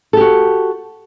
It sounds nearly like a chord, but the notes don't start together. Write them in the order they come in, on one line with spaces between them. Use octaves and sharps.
A4 G4 F#4